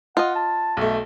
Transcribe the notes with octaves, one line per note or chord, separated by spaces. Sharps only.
F4 D#5 F#5
A5
B1 A3